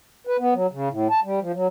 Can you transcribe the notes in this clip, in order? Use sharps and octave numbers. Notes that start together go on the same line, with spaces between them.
B4
B3
F#3
C#3
A2
A5
G3
F3
F#3